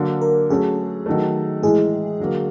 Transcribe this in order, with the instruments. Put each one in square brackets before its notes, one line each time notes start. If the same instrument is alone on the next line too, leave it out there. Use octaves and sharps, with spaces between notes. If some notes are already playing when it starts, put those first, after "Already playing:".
Already playing: [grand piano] D3 F#3 A#3
[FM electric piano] A#4
[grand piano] F#3 A3 C#4 [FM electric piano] G#4
[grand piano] D#3 F#3 A3
[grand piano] A2 E3 G#3 [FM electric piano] G#4
[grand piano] D3 F#3 A#3